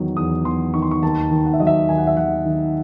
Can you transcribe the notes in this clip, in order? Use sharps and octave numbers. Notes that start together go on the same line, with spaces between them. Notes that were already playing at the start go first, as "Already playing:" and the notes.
Already playing: E2 D#3 F#3
E2 D#6
E2 C6
D#3 C#6
C6
C#6
D#2 A5
D#3
F#5
E5
F#3 D#5
E5
D#2 G#5
F#5
E5
D#2 F#5
D#3